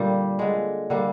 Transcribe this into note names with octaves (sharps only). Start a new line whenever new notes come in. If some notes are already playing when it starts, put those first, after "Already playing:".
Already playing: A#2 D3 G3 A#3
D3 G#3
D3 G3 A#3